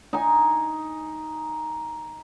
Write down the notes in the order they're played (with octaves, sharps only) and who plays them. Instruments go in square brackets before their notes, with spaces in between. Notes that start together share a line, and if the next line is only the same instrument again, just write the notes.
[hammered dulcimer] D#4 G#5